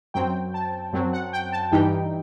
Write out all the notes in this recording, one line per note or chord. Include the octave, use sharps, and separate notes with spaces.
F#2 F#3 C4 G5
A5
F#2 F#3 C4
F#5
G5
A5
G2 E3 G3 D#4 G5